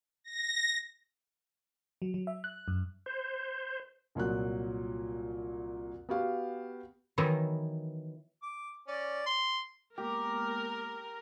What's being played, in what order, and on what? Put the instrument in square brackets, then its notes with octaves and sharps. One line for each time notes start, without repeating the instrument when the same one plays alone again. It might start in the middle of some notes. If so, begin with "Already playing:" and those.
[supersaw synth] A#6
[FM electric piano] F#3
F#3
E5
F#6
F#2
[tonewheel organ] C5
[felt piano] C2 A#2 F#3 F#6
B3 F#4 G4 F5
[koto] D#3 E3 F#3 B3 D#4 E4
[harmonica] D6
C#4 D5
C6
[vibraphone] G#3 A#3 B3 [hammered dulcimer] G4 [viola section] A#4